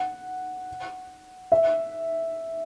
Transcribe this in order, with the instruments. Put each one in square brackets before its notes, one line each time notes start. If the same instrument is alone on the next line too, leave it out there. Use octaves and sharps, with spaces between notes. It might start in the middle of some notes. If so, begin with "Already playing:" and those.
Already playing: [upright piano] F#5
E5